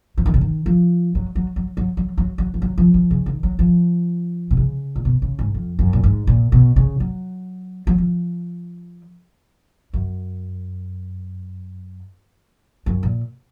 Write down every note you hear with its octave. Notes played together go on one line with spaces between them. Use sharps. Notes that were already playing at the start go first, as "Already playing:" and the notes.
F3
D#3
C#3
D#3
F3
F#3
F#3
F#3
F#3
F#3
F#3
F#3
F3
F#3
F3
F3
C#3
D#3
F#3
F3
B2
C#3
A#2
B2
C#3
G#2
F2
F#2
A#2
G#2
A#2
B2
C#3
F#3
F#3
F3
F#2
F#2
A#2